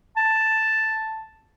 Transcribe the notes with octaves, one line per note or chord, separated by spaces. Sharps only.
A5